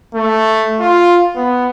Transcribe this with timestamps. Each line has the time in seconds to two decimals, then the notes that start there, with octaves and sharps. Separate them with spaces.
0.15 A3
0.80 F4
1.36 B3